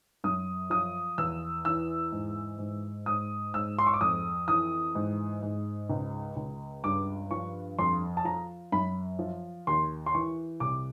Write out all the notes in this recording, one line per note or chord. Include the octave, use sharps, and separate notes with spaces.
F#2 D#6
F3 D#6
E2 E6
E3 E6
G#2
G#2
G#2 D#6
G#2 E6
C6
C#6
D6
F2 D#6
E3 D#6
G#2
G#2
C#2
C#2
G2 D6
F3 C#6
F2 C6
A5
F3 A#5
F#2 B5
F3
D#2 C6
C6
E3 C#6
C2 D6